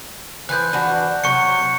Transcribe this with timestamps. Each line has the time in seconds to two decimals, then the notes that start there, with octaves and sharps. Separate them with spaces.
0.49 E3 F3 B4 F#6 G6
0.73 E3 D4 F#4
1.24 C3 F#3 C#6 C#7